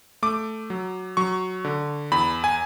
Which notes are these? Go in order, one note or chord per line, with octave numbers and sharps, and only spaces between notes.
A3 D6
F#3
F#3 C#6
D3
E2 B5
G#5